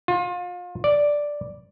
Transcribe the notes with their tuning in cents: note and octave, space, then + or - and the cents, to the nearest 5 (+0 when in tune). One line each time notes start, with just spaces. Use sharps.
F4 +30
D5 +0